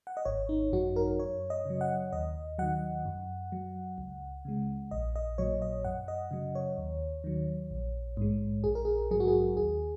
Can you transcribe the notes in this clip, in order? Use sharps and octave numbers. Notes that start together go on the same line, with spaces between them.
F#5
D#5
G#1 C#5
D#4
F#2 F#3 F#4
A#4
F#2 C#5
D#5
C#3 F#3
F#5
D#2 D#5
D#3 F#3 F#5
F#2
F#3
C#2
C#3 G#3
A#1 D#5
D#5
A#2 F#3 C#5
D#5
F#2 F#5
D#5
C#3 F#3
C#5
D#2
D#3 F#3
A#1
G#2 G#3
A#1 G#4
A#4
G#4
G#2 F#3 G#4
F#4
G#4
D#2 G#4